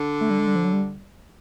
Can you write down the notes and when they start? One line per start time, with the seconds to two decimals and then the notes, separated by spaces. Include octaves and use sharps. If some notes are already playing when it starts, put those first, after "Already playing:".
Already playing: D3
0.21 A3
0.30 G3
0.39 G#3
0.47 G3
0.56 F3
0.65 F#3
0.73 G3